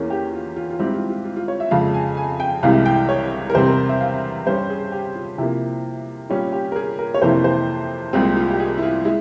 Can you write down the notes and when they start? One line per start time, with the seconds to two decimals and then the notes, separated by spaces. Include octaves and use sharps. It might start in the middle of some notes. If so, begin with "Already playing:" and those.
Already playing: E2 E3 A#3 C#4 G#4
0.10 G4
0.33 F4
0.56 F4
0.70 F4
0.79 G#2 G3 C4 E4 G4
0.95 F4
1.10 F4
1.25 F4
1.36 F4
1.48 C#5
1.60 E5
1.71 F2 C#3 F3 G#3 F5
1.94 G#5
2.17 G#5
2.40 G5
2.63 C2 C3 E3 G#3 E4 F5
2.86 G5
3.09 C#5
3.50 A#4
3.54 E2 C3 G3 C4 C5
3.66 A#4
3.89 E5
4.01 F5
4.46 G2 G3 C#4 C5
4.70 G#4
4.92 G4
5.15 F4
5.38 C3 F3 A#3 E4
6.29 A#2 G3 C#4 F4
6.52 G4
6.72 A#4
6.76 G#4
6.99 A#4
7.14 C#5
7.22 F2 C3 E3 A#3 E4 C5
7.44 C5
8.13 C2 A#2 F3 G#3 C4 F4
8.36 F4
8.50 G4
8.59 G#4
8.78 E4
8.83 F4
9.05 G#3 E4